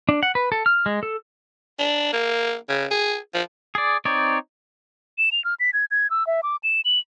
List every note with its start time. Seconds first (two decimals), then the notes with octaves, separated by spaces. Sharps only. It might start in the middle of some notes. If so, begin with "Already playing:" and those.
0.09 D4
0.23 F#5
0.35 B4
0.52 A4
0.66 F6
0.86 G#3
1.03 A4
1.79 D4
2.13 A#3
2.69 C#3
2.91 G#4
3.34 F3
3.75 G#4 D5
4.05 C4 D#4 C#5 D5
5.18 E7
5.32 F7
5.45 F6
5.60 B6
5.73 G#6
5.91 G#6
6.10 E6
6.27 E5
6.43 D6
6.63 E7
6.85 F#7